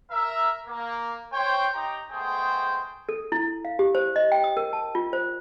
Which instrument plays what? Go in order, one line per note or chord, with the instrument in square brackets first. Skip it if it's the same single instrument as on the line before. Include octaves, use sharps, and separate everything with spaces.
[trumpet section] A#4 E5
A#3
C5 C#5 G5
D#4 G4 G5 A#5
G#3 A3 B3 G#4 C5 G5
[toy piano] A4
E4
F5
G4
C5
D#5
G5
D#6
A#4
A5
F4
C5